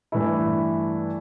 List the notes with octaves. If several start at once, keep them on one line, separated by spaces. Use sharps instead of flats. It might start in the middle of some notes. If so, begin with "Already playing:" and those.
G2 E3 A3 E4